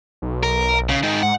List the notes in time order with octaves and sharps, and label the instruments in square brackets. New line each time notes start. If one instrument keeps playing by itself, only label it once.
[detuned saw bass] B1
[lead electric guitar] A#4
C#3
G#2 D#3
[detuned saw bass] G#2 [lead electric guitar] F#5